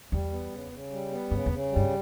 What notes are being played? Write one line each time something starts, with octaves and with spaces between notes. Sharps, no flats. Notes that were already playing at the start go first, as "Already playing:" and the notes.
E2 G3
B3
C#3
C#3
G3
B3
G2 C#3
E2
C#3
G3
G2